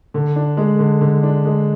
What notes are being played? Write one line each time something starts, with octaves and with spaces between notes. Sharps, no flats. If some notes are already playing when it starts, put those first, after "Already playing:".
D3
D4
G#3
D3
D3
D4
G#3